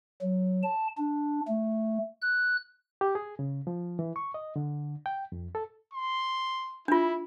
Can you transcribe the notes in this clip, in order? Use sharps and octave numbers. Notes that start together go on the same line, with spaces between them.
F#3
A5
D4
A3
F#6
G4
G#4
C#3
F3
E3
C#6
D#5
D3
G5
F2
A4
C6
D4 E4 F4